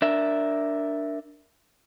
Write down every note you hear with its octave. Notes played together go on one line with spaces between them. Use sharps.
D4 A#4 E5